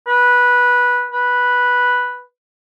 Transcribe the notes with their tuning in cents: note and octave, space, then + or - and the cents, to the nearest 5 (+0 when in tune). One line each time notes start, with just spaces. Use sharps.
B4 -10
B4 -5